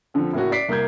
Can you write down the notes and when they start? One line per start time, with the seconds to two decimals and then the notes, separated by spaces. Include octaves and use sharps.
0.14 D3 F3 C4
0.33 A2 C#3 A#3 C#4 F#4
0.52 D5 B6 C7 D7
0.69 C2 A#3 A#4 G6 G#6